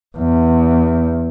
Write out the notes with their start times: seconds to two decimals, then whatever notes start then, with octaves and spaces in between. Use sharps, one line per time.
0.18 E2